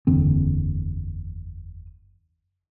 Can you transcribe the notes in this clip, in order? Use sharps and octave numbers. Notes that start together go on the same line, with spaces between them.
F#1 E2 D3 C4